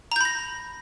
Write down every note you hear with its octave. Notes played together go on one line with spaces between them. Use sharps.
A#5 B5 G6 A#6